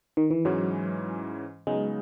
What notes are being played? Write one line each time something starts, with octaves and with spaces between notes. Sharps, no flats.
D#3
E3
G#2 E3 F#3 G#3 C#4
C#3 F#3 G#3 B3 D#4